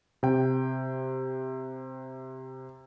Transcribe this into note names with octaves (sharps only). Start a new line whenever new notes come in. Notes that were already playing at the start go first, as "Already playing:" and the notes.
C3 G5